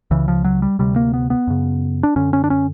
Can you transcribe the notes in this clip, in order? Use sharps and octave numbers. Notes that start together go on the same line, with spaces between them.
C#2 C#3 E3
F3
F#3
G3
D2 C3 G3
A#3
B3
B3
F#2 C#3
D4
F#2 D3 C#4
C#4
D4
C#4